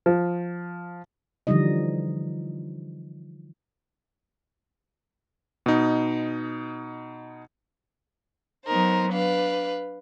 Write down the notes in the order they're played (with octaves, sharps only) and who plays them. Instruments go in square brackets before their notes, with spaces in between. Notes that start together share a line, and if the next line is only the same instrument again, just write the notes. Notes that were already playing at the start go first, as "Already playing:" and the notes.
[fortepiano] F3
[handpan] D3 E3 F3 G3 D#4 D#5
[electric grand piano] B2 D#4
[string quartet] F#3 B3 D#4 A#4 C5
D4 B4 F5